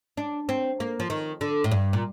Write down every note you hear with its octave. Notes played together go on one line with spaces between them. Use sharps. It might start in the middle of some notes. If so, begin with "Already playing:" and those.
D4
C4
A#3
F3
D#3
D3
A2
G2
A#2